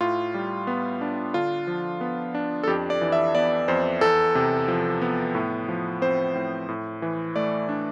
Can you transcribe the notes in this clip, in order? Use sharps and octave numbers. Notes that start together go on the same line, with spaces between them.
A2 F4
G3
B3
D4
D3 F4
F3
B3
D4
A4
F2 G4
D5
E3
E5
B3 D5
F2 C5
E2 A4
C3
F3
B3
A2
F3
C4 C5
A2
A2
E3
A3 D5
D4